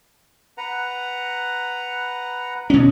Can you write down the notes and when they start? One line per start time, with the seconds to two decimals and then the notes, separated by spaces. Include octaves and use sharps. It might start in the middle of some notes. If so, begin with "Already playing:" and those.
0.58 B4 F#5 A#5
2.70 B2 C#4 D#5